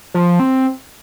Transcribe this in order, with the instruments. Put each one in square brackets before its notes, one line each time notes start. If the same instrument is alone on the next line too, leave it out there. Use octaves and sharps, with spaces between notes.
[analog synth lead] F3
C4